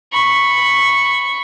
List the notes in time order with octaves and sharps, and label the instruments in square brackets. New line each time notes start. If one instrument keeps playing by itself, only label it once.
[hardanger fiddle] B5 C#6